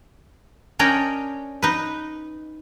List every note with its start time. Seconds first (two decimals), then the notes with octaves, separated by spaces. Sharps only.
0.79 C#4 D4 A#4 C#5 D#5 G5
1.62 D#4 B4